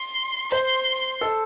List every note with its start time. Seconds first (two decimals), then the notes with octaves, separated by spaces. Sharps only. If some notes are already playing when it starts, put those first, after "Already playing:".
Already playing: C6
0.52 C5 C6
1.21 A4